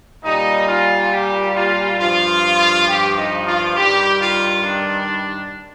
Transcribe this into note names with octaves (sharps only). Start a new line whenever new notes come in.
A#2 G3 D#4
F4
G4
F4
G2 F3 F4
G4
D#4
F4
G2 D#3 G3 G4
F4
D4